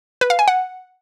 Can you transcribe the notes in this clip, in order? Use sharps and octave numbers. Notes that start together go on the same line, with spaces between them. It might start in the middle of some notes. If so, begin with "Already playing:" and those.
B4
F5
G#5
F#5